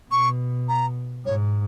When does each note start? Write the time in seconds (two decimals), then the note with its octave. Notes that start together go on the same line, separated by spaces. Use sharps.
0.11 B2 C#6
0.69 A#5
1.25 G#2 C#5